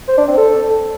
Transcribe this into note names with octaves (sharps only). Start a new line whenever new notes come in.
C5
D4
C4
A4